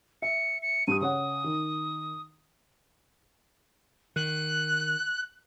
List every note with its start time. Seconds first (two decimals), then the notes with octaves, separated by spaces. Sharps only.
0.22 E5 C#7
0.62 C#7
0.87 G2 G4 D#6 D#7
1.01 C#3 C#5 F#5 D#6
1.44 D#3
4.16 D#3 F#6